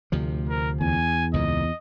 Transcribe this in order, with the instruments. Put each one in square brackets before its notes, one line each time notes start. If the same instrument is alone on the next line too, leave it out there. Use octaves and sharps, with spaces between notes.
[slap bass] D2 C3 F3
[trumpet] A#4
[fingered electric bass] E2 [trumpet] G#5
[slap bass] C#2 A#2 [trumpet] D#5